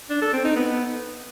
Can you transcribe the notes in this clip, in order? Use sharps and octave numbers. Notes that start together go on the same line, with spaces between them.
D4
A4
C4
D#4
B3